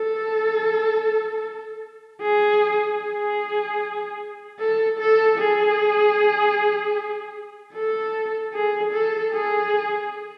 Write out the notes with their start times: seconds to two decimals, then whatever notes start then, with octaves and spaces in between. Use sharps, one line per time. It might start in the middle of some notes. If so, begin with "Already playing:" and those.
Already playing: A4
2.23 G#4
3.01 G#4
4.59 A4
4.99 A4
5.39 G#4
7.74 A4
8.53 G#4
8.93 A4
9.33 G#4